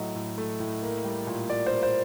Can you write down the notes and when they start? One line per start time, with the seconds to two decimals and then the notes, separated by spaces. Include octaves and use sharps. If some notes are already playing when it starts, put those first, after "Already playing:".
Already playing: A2 F#3 A3 D#5
0.15 A2
0.38 A3
0.60 A2
0.82 A#3
1.04 G3
1.27 A#2
1.50 A#2 D5
1.66 C5
1.72 A#3
1.83 C5